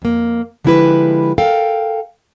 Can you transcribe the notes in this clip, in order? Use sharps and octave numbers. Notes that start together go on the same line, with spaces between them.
F2 A#3
D3 F3 G#3 E4 G4 B4
A4 A#4 F5 G5